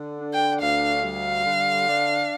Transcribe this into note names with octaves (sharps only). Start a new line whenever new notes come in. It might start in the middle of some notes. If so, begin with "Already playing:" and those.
Already playing: D3
D4
G5
D2 F5
G3 F5
D3
D4